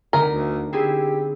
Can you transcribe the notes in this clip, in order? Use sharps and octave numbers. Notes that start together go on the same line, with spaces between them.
D3 B3 D#4 A#4
D2
C4 E4 G4 G#4